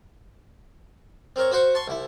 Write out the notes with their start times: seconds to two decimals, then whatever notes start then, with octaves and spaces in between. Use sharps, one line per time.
1.36 C4 A#4 C#5
1.51 F#4 C5 F#5 C#6
1.75 A5 C6 C#6
1.88 C2 E4